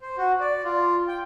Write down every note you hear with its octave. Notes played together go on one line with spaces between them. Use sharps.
C5
F#4
D5
F4
G5